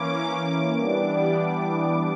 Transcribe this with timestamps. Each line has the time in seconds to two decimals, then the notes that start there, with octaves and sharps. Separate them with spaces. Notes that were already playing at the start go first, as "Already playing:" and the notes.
Already playing: E3 A#3 C#4 D6
0.78 E3 G3 B3 D4